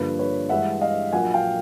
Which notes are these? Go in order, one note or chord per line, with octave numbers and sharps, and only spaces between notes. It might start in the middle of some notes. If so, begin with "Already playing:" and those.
Already playing: G2 D3 F3 A#3 B4
B4 C#5
G2 E3 G#3 E5 F#5
D#5 F5
A#1 A#2 F#3 A#3 F#5 G#5
F5 G5